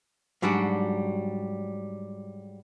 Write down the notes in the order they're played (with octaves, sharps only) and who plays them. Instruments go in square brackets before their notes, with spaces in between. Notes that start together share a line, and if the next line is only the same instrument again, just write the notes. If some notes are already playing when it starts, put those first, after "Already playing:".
[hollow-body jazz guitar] G#2 F#3 G3 D4 F#4